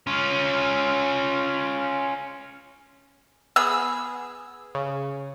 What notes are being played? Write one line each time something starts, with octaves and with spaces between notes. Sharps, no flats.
C#4 F4
B3 G#4 E6
C#3